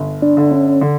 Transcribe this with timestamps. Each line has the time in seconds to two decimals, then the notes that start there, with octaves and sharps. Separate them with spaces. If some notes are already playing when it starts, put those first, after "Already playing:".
Already playing: G1
0.22 D4
0.37 D3
0.51 C#4
0.81 D3